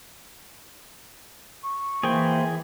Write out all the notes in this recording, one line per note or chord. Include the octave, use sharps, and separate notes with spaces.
C#6
E3 A#3 G#4 C5 G5